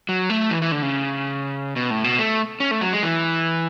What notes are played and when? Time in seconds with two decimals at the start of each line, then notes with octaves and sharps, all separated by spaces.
0.09 F#3
0.30 A3
0.51 E3
0.62 E3
0.72 D3
0.83 C#3
1.76 B2
1.90 A2
2.04 B2
2.19 A3
2.60 C#4
2.71 A3
2.81 F#3
2.93 G#3
3.03 E3